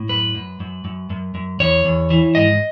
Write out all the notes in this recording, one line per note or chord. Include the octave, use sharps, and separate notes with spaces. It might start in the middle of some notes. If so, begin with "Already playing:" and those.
Already playing: A2
F#2 B4
F#2
F#2
F#2
F#2
F#2
E2 C#5
E2
E3
G#2 D#5